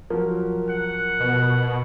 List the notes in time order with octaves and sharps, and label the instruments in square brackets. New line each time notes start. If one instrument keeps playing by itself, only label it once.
[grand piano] F3 F#3 [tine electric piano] A#4
[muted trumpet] F#5
[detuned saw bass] B2